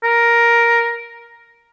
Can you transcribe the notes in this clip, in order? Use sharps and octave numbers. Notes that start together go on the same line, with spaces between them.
A#4